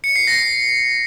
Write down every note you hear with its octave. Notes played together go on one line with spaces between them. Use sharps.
C#7
C7
A#6